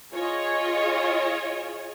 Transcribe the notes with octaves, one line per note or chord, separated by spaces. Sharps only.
F4 G#4 C#5 D#5